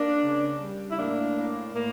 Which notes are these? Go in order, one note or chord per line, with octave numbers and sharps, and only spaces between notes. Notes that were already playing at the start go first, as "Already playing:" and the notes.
Already playing: A#3 D4
C#3
G3
E4
A2 A#3 D4
A#3
A2 A#3